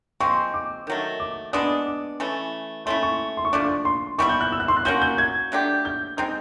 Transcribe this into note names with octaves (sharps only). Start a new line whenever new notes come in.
F3 G#3 C4 C#6
D6
D#3 F#3 A3
D6
G#3 B3 D4 D#6
D6
E3 A3 C#4
A3 C#4 E4 C6
C#6
C6
C#6
F3 A3 D4 D6
C#6
C6
E3 G3 B3 E4 C#6
G6
F#6
E6
F#6
C6
F#6
A#3 C#4 F#4 G6
G6
G#6
F#3 A3 D4 G4
G6
G#3 C4 D#4 G6